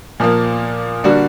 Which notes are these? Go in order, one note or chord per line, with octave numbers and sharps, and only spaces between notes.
A#2 F3 A#3
D3 G3 A#3 D4 F#4